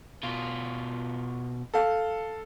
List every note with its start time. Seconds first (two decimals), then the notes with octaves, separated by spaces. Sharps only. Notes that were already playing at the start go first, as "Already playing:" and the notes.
0.24 B2 F4
1.74 A4 F5